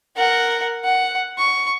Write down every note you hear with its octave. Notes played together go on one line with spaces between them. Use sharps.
A#4 F#5
F#5
C#6